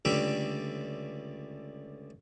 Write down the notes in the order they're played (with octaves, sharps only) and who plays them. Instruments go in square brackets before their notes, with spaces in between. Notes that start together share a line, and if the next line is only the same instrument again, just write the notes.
[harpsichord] C#2 D3 G3 A3 D5 E5